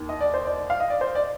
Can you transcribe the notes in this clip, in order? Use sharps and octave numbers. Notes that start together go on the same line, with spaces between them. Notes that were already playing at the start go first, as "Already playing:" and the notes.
Already playing: D#2 D#3
D#5
D5
C5
D5
F5
D#5
D5
C5
D5